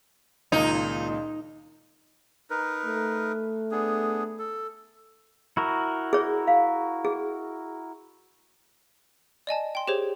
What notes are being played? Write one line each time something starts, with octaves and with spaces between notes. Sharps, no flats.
C#2 A#2 D#3 D#4
D#4 A#4 B4
A3
B3 D4 G#4
A4
E4 F#4 A#4
G#4 C#5
F5
G#4
D5 D#5 G#5 A5
G5 C6
G4 G#4 C5 C#5